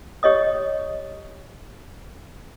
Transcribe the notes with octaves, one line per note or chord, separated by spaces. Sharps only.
G4 C#5 D#5 D#6